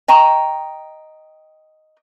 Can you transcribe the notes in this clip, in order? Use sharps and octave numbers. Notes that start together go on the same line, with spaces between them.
D#5 G5 A#5 C#6